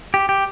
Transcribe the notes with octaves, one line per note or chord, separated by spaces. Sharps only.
G4
G4